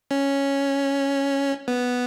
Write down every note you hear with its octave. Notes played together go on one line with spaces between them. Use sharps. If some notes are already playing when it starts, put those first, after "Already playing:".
C#4
B3